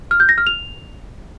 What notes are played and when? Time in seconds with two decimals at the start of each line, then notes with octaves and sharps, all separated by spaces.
0.11 F6
0.20 G6
0.29 A#6
0.38 F6
0.47 F7